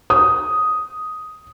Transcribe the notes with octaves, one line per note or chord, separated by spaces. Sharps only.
D#6